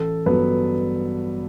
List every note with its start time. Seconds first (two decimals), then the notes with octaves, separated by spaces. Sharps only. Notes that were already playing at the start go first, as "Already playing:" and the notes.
Already playing: A1 A4
0.26 G2 F#3 B3 B4